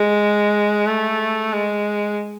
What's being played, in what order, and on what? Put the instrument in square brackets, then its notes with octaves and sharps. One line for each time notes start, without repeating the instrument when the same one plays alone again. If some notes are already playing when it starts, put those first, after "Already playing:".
Already playing: [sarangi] G#3
A3
G#3